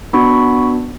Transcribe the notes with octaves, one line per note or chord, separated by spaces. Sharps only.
B3 D4 F#4 B5 C#6